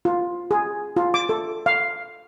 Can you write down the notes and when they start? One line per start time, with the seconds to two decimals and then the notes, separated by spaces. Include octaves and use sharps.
0.05 F4
0.51 G#4
0.96 F4
1.14 D6
1.29 A4
1.66 F5